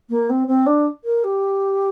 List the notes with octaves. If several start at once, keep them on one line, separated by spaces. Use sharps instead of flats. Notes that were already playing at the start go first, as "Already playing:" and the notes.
A#3
C4
C4
D4
A#4
G4